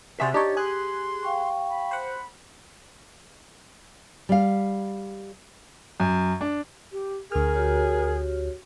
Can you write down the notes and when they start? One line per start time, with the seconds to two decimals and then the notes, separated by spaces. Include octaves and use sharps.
0.20 C3 F#4 G#4 C5 D5 E5
0.34 D4 D#4 G4 C#5 A6
0.57 G#4 G#5 C6 F#6
1.23 F5 G5 C#6
1.69 B5
1.91 C5 F#5
4.29 G3 F5
6.00 F#2
6.41 D4
6.92 G4
7.32 D2 G#4 A#4 F6
7.55 F#4 G4 C#5